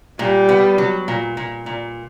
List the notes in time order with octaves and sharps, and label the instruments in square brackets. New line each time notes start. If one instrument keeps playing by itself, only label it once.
[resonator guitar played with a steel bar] A#2 [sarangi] G3
[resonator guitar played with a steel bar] B3
F#3
A#2
A#2
A#2